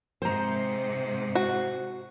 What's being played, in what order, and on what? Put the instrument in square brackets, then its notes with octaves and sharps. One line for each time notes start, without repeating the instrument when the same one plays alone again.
[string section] G#2 C3 [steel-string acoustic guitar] C5 A#5
[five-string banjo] F#4